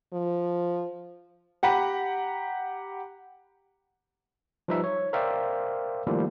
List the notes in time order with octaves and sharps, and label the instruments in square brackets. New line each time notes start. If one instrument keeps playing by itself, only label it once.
[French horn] F3
[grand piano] G4 F#5 A#5 B5
[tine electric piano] F3 G3 D#4 B4 E5
C#5
A#4 C5 D5 E5 F5 G5
D#3 F3 G3 A3 A#3 E4